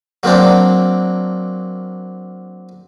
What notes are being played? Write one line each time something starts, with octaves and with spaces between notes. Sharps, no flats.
F#3 A#3 C4 D4